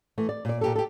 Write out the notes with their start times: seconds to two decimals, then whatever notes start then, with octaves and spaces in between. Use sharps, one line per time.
0.18 E3 A3
0.29 D5
0.45 A#2 D5
0.61 A#2 G4 A4
0.76 G4 A4